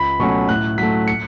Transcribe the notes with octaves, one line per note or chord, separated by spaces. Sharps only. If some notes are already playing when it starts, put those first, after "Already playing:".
Already playing: C#2 B5
B2 F#3 A3 C#4 C#6
A2 F#6
F#3 A3 B6
C#7